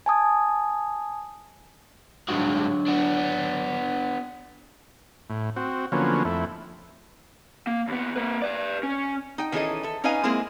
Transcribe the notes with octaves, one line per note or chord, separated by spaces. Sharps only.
G#5 A5 D#6 G#6
G2 D3 F#3 G#3 F#4
B3 D4
A2
C4 F#4
D3 F3 F#3 A#3 B3 C#4
F2 A3 E4
A#3
D#2 B3
A#3 B4
B4 D5
C#4
D#4 G5
D#3 E3 C#4 G#4 A4 D#5
A4 E5
C#4 D#4 B4 D#5 F5 G#5
G#3 A#3 C4 E4 G#4